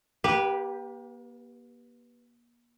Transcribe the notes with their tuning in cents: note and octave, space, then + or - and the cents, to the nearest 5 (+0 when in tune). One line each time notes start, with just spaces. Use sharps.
A#3 +40 G4 +0 B4 -10